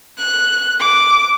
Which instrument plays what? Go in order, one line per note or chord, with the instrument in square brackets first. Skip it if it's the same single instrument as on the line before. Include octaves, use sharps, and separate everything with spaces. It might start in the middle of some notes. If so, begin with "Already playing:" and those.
[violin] F#6
D6